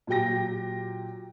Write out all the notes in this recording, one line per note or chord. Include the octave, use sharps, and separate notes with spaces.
A#2 F#3 G4 G5 A#6